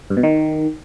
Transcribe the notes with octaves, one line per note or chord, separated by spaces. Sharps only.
G2
B2
D#3